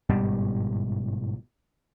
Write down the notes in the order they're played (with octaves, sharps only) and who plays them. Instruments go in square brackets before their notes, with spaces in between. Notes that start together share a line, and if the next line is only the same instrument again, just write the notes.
[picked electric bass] G1 G#2 B2 G3